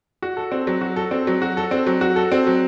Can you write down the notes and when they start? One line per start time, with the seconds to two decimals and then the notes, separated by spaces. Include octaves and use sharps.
0.22 F#4
0.37 A4
0.52 C4
0.67 F#3
0.81 F#4
0.96 A4
1.11 C4
1.27 F#3
1.42 F#4
1.57 A4
1.71 C4
1.86 F#3
2.01 F#4
2.16 A4
2.32 C4
2.47 F#3